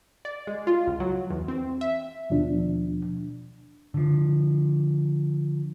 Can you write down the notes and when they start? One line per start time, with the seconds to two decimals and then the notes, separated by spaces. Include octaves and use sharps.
0.25 D5
0.47 G#3
0.67 F4
0.87 C#2
1.00 F#3
1.30 E2
1.48 C4
1.81 E5
2.30 D#2 B2 F3 D4
3.94 D3 F3